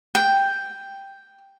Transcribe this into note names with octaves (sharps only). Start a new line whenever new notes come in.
G5